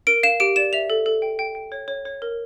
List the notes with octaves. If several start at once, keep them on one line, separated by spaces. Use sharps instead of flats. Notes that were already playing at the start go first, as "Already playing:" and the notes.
A#4 D7
F5 E7
G4 D7
D5 E7
E5 F7
A4
A4
G5
G5
G5
C#5
C#5
C#5
A#4